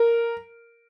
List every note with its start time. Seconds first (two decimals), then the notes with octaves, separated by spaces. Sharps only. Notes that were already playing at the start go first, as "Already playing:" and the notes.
Already playing: A#4